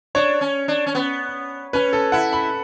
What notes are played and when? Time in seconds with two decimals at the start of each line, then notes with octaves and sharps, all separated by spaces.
0.15 D4 C#5
0.41 C#4
0.68 D4
0.86 C#4
0.95 B3
1.73 C#4 B4
1.93 A4
2.12 E4 F#5
2.33 B5